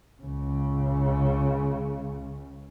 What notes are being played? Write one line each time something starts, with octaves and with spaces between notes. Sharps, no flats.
C#2 C#3